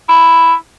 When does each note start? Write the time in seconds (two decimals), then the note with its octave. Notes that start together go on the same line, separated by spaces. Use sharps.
0.09 E4